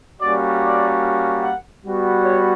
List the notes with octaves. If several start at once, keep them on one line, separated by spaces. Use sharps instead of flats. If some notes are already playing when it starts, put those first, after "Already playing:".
G3 A#3 C#4 F#4 D5
D5
F#5
G3 B3 F#4
C#5